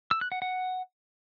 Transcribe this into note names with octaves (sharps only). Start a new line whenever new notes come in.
E6
F#6
F#5
F#5